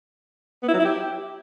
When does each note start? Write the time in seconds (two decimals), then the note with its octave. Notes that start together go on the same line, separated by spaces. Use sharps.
0.63 B3
0.68 E4
0.74 F#3
0.79 E4
0.85 G4